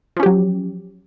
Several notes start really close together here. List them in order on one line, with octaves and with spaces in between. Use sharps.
F3 C#4 G4 F#3